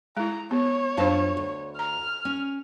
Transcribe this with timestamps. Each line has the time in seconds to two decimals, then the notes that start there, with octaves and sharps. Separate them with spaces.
0.17 G#3 E4 A#5
0.51 B3 C#5
0.97 F#2 D4 F4 C5 F5 A5
1.37 D2
1.79 A#5 F6
2.25 C#4